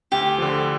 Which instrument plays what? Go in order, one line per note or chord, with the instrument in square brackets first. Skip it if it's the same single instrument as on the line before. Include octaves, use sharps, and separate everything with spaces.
[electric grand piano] D2 [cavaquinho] G4
[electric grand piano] D3 F3